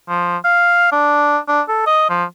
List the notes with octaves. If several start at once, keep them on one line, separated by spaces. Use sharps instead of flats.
F3
F5
D4
D4
A4
D#5
F3